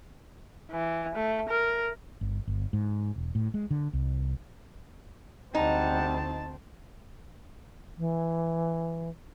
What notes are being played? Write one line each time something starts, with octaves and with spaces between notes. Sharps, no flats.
E3
A3
A#4
G1
G1
G#2
E1
A2
G#3
D3
C2
D2 G3 C4 D#4 F#5 G5 A5
E3